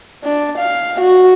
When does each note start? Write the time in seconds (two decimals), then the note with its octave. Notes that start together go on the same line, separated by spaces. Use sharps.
0.24 D4
0.58 F5
1.00 F#4